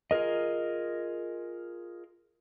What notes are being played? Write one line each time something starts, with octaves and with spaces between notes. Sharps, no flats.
F4 G#4 A#4 D#5